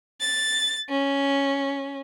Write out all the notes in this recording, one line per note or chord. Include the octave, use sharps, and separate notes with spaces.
A6
C#4